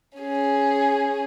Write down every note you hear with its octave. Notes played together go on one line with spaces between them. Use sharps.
C#4 G#4